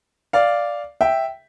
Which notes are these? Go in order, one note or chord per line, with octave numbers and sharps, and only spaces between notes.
D5 F5
E5 G5